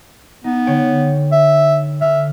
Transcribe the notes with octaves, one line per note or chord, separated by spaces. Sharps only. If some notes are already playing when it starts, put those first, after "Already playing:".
B3 D#4
D3 C#5 G5
E5
D3 E5 F6